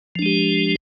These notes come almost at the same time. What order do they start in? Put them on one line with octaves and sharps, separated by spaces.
F3 D4 G#3 G4